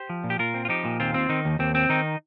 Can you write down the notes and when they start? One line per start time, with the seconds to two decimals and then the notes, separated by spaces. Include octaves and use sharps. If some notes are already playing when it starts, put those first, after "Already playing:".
Already playing: G4 C5
0.09 F3
0.24 A#2
0.30 G4
0.39 A#2 F4 A#4
0.54 C4
0.65 F4
0.69 F3 D#4 G4
0.85 A#2
1.00 D#2 C4 F4
1.14 C4
1.29 D#3 D#4
1.45 D#2
1.59 D#2 C4
1.75 C4
1.89 D#3 D#4